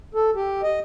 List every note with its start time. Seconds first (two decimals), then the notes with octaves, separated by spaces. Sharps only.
0.15 A4
0.35 G4
0.63 D#5